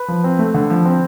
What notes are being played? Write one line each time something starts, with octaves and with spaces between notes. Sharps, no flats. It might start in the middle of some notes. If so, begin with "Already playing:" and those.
Already playing: B4
F3
C4
A3
D3
F3
C4